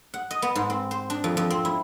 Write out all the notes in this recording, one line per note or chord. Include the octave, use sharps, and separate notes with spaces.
F#5
D#5
B3
G#2
C4
C5
D4
F2
F2
C4
E4